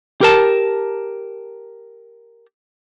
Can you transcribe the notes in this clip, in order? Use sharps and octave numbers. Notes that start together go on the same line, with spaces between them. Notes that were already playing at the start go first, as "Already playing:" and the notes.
G4 A#4 A5